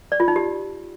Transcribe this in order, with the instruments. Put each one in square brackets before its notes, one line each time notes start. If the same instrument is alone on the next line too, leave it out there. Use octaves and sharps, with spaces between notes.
[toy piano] D5
F4
D#4
G4